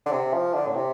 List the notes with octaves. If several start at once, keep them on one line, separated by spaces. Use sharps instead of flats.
D3
C3
F3
D3
A2
C3